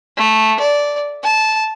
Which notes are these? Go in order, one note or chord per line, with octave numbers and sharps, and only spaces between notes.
A3
D5
A5